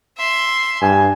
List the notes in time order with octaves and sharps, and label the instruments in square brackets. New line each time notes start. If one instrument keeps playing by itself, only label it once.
[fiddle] E5 C6
[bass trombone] G2 [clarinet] G#5